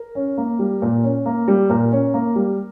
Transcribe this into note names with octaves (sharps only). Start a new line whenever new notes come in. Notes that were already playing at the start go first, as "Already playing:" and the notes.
Already playing: A#4
C#4
A#3
G3
A#2
C#4
A#3
G3
A#2 A#4
C#4
A#3
G3